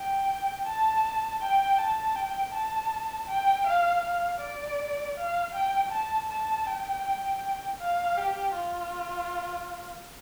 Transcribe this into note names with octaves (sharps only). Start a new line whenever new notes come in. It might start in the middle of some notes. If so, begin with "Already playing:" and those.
Already playing: G5
A5
G5
A5
G5
A5
G5
F5
F5
D5
F5
G5
A5
A5
G5
F5
G4
F4